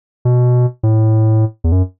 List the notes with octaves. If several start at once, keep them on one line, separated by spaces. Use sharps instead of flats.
B2
A2
E2
F#2